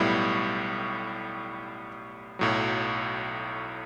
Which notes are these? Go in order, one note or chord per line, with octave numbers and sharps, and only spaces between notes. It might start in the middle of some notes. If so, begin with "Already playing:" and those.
Already playing: B1 A2 G3 B3 E4
B1 A2 F#3